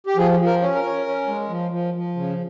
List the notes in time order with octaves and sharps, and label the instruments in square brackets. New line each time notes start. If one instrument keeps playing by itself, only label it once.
[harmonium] G4
F3 G#4
F3
A#4
C#4
A#4
C#4
C#4
G#3
F3
F3
F3
C#3